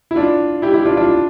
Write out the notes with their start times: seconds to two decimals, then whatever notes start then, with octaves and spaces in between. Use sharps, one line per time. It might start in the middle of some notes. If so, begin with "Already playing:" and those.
0.11 E4
0.16 D4 F4
0.62 E4 G4
0.74 E4 G4
0.86 D4 F4
0.97 D4 F4